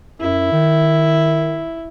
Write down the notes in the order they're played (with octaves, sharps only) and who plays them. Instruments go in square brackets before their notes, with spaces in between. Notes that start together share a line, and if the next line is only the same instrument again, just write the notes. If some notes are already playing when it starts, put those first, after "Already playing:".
[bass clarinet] F#2 [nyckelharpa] E4
[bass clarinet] D#3